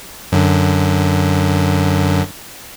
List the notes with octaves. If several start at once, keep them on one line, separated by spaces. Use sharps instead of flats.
F#2 D3